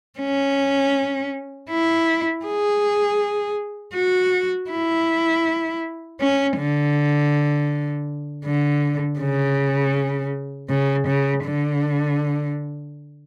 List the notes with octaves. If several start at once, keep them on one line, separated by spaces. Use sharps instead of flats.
C#4
E4
G#4
F#4
E4
C#4
D3
D3
C#3
C#3
C#3
D3